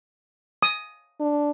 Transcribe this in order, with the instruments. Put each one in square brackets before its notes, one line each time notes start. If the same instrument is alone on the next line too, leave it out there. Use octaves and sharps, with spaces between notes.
[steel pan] D#6
[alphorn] D4